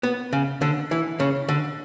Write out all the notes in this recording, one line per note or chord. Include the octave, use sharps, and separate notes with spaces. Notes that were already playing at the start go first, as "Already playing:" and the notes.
B3
C#3
D3
E3
C#3
D3